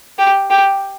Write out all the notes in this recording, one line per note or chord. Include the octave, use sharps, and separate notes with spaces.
G4
G4